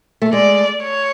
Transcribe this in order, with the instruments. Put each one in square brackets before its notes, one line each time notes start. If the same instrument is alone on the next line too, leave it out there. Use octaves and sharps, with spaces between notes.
[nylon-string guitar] A3
[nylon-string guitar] G#3 [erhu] D5
[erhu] C#5